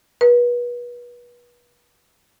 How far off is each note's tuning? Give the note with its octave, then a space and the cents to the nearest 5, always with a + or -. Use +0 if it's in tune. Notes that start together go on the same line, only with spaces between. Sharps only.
B4 -30